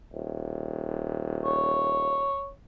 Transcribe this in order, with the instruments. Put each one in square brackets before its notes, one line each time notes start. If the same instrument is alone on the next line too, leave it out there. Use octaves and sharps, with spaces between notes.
[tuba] D#1
[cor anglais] C#5